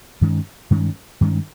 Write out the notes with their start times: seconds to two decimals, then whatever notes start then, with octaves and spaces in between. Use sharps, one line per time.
0.21 G2 D#3 G#3 C#4
0.71 G2 D#3 G#3 C#4
1.21 G2 D#3 G#3 C#4